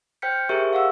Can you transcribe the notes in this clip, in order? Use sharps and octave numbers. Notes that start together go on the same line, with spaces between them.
C5 G5 F6 G6 B6 C#7
G4 G#4 A#4 C5 E5 C#6
F5 F#5 E6